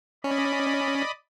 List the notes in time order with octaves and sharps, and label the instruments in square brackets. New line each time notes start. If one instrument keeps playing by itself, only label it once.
[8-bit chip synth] C#4 [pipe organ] D5 D#5 B5